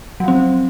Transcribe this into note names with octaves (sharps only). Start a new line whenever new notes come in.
F3 F#3 C4